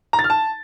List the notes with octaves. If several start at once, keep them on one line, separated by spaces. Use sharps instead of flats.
A#5
A6
F6
A5